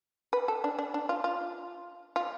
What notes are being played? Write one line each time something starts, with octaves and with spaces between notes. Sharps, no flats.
B4
A4
D4
D4
D4
F4
F4
F4